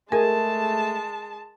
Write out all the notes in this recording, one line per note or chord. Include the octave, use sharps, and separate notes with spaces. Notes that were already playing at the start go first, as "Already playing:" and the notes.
G#3 A3 G#4 A#4 G#5 A5